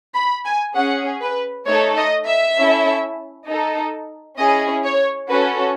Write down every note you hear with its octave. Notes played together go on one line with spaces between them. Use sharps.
B5
G#5
C#4 G#4 F#5
B4
A3 D#4 A4 C#5
D#5
E5
C#4 E4 A4
D#4 A4
C#4 E4 G#4 D#5
C#5
C#4 F#4 A4 B4